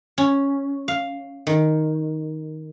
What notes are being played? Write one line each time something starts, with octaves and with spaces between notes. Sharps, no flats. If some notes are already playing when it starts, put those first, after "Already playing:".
C#4
F5
D#3